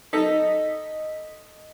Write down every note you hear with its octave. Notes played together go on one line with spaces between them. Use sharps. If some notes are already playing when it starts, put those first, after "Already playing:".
D#4 A4 D#5 B6